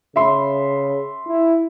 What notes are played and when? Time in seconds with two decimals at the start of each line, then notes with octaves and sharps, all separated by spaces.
0.16 C#3 E5 B5 C6
1.28 E4